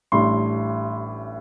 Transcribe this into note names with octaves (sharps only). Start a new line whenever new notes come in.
A1 A2 G3 D4 C6